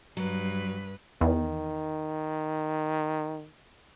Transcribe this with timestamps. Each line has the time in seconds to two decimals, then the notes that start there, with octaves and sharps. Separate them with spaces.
0.17 G2 F#3 B4
1.21 E2 D#3